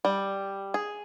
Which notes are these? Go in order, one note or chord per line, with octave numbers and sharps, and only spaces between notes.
G3
G#4